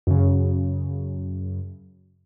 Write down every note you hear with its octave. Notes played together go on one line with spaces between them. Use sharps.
F#2 C#3